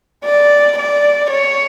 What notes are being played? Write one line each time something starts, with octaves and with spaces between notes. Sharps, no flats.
D5
D5
C#5